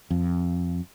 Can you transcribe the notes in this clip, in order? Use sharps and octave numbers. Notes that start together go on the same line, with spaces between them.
F2